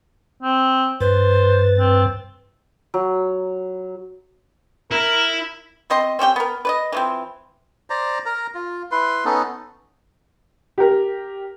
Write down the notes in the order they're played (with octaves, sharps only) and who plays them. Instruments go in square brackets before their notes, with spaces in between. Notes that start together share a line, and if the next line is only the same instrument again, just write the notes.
[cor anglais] C4
[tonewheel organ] G2 A6 [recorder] B4 [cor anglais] C5
[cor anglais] C4
[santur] F#3
[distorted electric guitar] E4 [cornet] A#4
[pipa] B2 C4 D#5 C6
C4 C#4 G4 G5
B3 A#4
B4 D5 D#5
E3 F3 C4
[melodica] C5 D5 A#5
A#4 A#5
F4
E4 B4 C6
B3 C#4 D#4 A4
[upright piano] G4 A#4